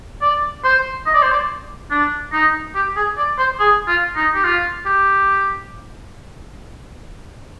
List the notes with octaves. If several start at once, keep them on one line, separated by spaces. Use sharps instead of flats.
D5
C5
D#5
D5
C5
D5
D4
D#4
G4
G#4
D5
C5
G#4
F4
D#4
G4
F4
G4